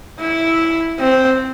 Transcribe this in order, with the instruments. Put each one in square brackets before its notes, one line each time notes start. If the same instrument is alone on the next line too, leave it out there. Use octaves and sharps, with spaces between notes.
[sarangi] E4
C4